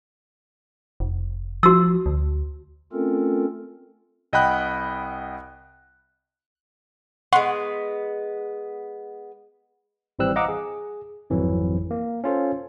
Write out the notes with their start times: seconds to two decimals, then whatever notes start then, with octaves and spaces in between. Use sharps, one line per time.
1.00 F1
1.63 F3 F#4 E6
2.06 D2
2.93 A3 C4 C#4 F4 A4 A#4
4.33 C2 D#5 F#5 G5 B5 F#6
7.33 G#3 B3 F#5 C6 C#6
10.19 G#1 E3 G3 C4 E6 F#6
10.36 D#5 F5 F#5 A#5 D6 E6
10.48 G#4
11.30 G#1 F2 E3 F#3
11.91 A#3
12.24 C#4 F4 A4 C5